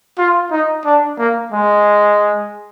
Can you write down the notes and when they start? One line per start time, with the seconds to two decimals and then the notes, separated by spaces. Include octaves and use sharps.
0.18 F4
0.51 D#4
0.85 D4
1.18 A#3
1.52 G#3